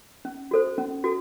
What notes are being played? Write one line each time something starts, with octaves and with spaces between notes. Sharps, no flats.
C#4
F#4 A4 C5
C#4
F#4 A4